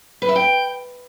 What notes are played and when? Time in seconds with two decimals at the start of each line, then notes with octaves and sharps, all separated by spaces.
0.22 B4
0.29 E5
0.36 G5